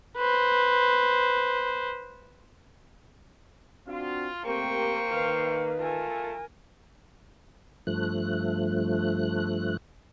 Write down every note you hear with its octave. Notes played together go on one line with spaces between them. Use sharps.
B4 C5
C4 D4 F4 F#4
A3 A#3 C4 G4 A#4 C5 G5 C#6
D#3 B4 F5
A3 F4 A4 A#4 G#5 A5
G2 F3 A3 F#6